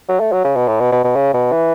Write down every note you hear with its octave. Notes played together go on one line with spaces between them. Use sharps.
F#3
A3
F#3
C#3
B2
A2
B2
B2
B2
C#3
B2
E3